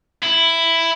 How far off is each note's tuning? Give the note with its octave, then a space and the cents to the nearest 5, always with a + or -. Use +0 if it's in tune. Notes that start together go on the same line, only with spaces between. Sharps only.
E4 +5